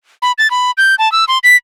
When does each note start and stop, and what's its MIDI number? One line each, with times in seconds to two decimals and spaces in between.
0.22 0.32 83
0.38 0.50 93
0.51 0.71 83
0.78 0.95 91
0.99 1.11 81
1.12 1.25 88
1.28 1.38 84
1.44 1.56 95